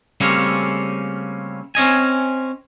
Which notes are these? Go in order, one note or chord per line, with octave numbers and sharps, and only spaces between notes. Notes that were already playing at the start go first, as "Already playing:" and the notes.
C#3 G3 A3 A#3 C4 C#4
C4 C#4 D#5 G#5